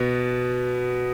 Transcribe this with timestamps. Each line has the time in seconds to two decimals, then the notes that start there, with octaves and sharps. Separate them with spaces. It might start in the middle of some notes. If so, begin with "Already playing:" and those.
Already playing: B2 B3